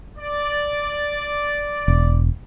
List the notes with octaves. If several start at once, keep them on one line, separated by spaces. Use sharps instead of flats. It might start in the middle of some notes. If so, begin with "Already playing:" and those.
D5
E1